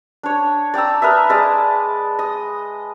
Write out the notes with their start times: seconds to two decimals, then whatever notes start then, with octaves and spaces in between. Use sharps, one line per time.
0.23 D4 C#5
0.74 D5 G5 A#5 E6
1.02 A#4 B4 D#5 E5
1.29 G#3 D5 D#5 A5
2.19 D#5